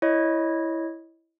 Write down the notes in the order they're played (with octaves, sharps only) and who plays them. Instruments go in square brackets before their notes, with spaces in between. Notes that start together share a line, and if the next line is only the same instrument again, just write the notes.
[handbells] E4 C#5 D#5